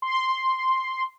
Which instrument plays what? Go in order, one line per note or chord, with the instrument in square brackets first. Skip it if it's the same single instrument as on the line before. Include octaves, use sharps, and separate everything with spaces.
[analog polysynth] C6